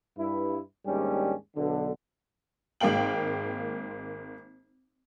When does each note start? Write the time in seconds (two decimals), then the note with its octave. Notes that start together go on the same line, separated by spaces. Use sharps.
0.18 G2 E4
0.86 D#2 G#2 G3 C#4 D4 G4
1.56 B1 D3
2.80 G#1 G#3 A#3 F5 G5 F#7